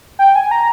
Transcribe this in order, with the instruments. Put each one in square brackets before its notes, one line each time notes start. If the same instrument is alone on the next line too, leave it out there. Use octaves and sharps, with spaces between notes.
[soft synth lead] G5
G#5
A#5